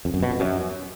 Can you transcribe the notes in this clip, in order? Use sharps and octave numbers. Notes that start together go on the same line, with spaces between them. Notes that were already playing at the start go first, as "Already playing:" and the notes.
F2
F#2
B2
F2
F#2